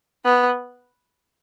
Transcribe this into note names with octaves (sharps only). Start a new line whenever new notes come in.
B3